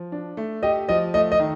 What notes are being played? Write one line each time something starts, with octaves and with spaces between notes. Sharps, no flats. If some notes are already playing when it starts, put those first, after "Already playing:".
Already playing: F3
D4
A3
G4 D#5
F3 D#5
A3 D#5
D#5
D#3